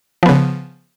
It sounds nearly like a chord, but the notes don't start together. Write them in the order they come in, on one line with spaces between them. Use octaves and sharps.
F3 B3 C#3